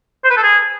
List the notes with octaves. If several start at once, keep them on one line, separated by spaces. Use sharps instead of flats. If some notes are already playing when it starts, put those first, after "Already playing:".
C5
B4
A4
G#4